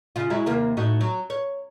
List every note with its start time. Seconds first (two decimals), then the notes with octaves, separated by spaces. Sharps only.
0.16 C#3 F4
0.30 F#3 G#3 E4
0.46 D#2 C3 A#3
0.77 A2 D#4 F#4
1.01 F#3
1.30 C#5